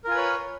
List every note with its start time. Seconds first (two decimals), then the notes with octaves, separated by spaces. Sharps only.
0.04 A#4
0.08 F4
0.11 G#5
0.14 B4
0.17 C#5